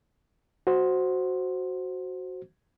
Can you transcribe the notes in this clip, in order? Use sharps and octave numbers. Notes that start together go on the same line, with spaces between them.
F#4 C5